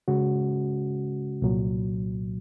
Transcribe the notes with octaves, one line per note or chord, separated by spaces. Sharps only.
C#3 G#3 C#4 F#4
C2 A#2 F#3